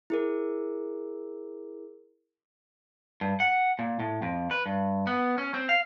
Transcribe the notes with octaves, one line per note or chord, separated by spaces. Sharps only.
E4 G#4 A#4
G2
F#5
A#2
A2
F2
B4
G2
B3
C#4
C4
F5